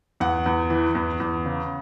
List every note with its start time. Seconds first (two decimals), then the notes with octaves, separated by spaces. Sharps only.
0.20 E2 F#5
0.46 E2
0.70 E3
0.95 E2
1.20 E2
1.45 C#3